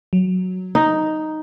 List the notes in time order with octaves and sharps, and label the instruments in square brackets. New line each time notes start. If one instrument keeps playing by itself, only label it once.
[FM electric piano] F#3
[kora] D#4